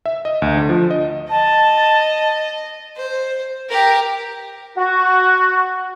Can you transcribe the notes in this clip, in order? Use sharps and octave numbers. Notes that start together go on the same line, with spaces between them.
E5
D#5
D2
D3
F3
D#5
D#5 A5
C5
G4 A#4
F#4